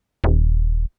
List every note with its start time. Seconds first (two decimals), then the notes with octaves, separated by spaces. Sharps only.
0.24 D#1